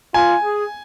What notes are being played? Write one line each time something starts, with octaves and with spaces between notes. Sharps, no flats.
F4 G#5
G#4